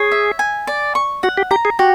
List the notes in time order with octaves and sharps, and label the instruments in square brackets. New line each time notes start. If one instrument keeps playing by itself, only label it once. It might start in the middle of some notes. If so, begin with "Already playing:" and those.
Already playing: [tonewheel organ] G#4 [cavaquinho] C#5
[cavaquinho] E5
G#5
D5
C#6
[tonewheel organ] F#4 [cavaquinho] F#5
[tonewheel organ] G4
[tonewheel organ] G4 [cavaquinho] A#5
[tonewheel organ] G#4
[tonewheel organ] F#4 [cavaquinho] G4